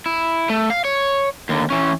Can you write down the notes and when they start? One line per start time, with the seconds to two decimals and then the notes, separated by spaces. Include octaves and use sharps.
0.06 E4
0.50 A3
0.70 F5
0.85 C#5
1.49 D#2 D3
1.70 E3 C#4